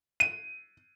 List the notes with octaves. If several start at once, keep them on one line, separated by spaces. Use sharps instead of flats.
D#7